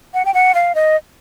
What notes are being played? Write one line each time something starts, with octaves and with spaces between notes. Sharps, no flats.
F#5
G5
F#5
F5
D#5